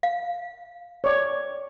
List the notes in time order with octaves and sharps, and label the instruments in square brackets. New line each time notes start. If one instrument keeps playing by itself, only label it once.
[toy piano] F5
[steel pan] C#5 D5